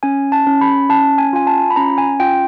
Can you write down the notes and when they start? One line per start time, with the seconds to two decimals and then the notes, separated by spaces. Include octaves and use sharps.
0.03 C#4 G#5
0.32 A5
0.47 C#4
0.61 B5
0.90 C#4 A5
1.18 G#5
1.33 F4 G#5
1.47 A5
1.70 B5
1.76 C#4 A#5
1.98 G#5
2.20 F4 G5